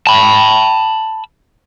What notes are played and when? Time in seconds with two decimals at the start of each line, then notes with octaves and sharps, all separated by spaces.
0.07 A5 B5